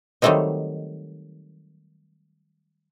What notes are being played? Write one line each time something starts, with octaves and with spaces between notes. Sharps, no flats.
D#3 F#3 G3 A3 C4 D#4